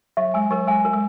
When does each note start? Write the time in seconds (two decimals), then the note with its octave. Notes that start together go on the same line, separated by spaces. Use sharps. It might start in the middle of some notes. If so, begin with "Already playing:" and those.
0.17 F#3 E5
0.34 G#3 G#5
0.50 F#3 A#4
0.67 G#3 G#5
0.85 A#4
0.93 G#3